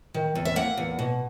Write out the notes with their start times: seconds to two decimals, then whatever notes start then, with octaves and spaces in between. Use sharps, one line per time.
0.14 D#3
0.35 E2
0.45 E5
0.56 A#3 F#5
0.77 E2
0.99 B2